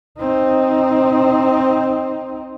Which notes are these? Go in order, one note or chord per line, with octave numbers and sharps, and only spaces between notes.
C4 D#4